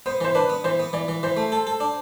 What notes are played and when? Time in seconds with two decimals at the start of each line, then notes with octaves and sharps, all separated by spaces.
0.06 B3 C5
0.21 E3 C5
0.35 D4 B4
0.50 B3
0.64 E3 C5
0.79 B3
0.93 E3 D5
1.08 E3
1.23 E3 C5
1.37 A3
1.52 A4
1.67 A4
1.80 D4